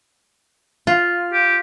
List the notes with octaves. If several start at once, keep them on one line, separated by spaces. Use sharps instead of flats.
F4
G4